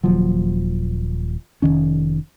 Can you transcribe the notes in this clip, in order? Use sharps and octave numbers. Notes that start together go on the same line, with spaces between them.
D#1 D#2 F3 F#3
F1 E2 D#3 C#4